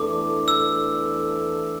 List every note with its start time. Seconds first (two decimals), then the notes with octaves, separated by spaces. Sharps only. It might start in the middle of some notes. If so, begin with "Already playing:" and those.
Already playing: E2 E3 A3 D4 A4 D6
0.48 E6